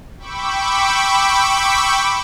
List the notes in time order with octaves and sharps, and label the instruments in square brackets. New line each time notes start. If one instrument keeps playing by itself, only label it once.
[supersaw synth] G5 B5 C#6 D6 E6